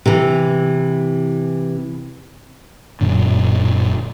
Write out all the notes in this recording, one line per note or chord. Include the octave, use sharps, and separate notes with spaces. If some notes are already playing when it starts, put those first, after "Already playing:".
C3 E3
D1 F#2 A#2 D3